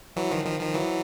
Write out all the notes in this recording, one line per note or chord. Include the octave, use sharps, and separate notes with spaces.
E3 F#3
D#3 F3
D#3 F3
D#3 F3
E3 F#3